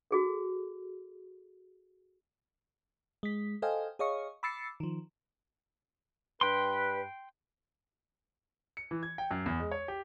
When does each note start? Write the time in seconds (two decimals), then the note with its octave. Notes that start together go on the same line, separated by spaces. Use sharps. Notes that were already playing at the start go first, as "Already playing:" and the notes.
0.11 F#4 G#4 A4
3.23 G#3 B6
3.62 A4 C5 D#5 F5 G5 G#5
3.99 G#4 C#5 D#5 F5 C#6
4.43 B5 D6 E6 A6 C7 C#7
4.80 D#3 F3
6.41 G2 B4 G5 C6
8.77 C#7
8.91 E3
9.03 G#6
9.18 G5
9.31 F#2
9.46 E2
9.60 G#3
9.71 C#5
9.88 G4